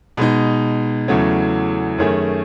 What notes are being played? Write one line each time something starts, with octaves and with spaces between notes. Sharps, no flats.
B2 G#3 D#4
E2 C#3 F#3 A3 C#4
F#2 D#3 A3 C#4 G#4